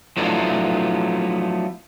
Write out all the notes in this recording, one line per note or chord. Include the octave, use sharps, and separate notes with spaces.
F3 F#3 A3 B3 D4 E4